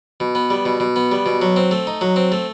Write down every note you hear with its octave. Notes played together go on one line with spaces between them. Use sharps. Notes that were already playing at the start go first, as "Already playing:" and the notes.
B2
B3
G3
B2
B2
B3
G3
B2
F#3
C4
A3
D#4
F#3
C4
A3